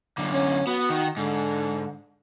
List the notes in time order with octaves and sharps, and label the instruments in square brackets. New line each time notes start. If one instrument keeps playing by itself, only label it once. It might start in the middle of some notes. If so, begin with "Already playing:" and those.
[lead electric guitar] F#2 D3
[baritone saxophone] C#4
[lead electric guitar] B3 [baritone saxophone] F#4
[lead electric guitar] D#3
[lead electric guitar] G#2 [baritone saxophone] D3